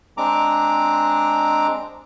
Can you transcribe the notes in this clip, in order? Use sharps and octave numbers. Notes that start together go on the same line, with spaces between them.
G#3 C4 D4 A#5 D6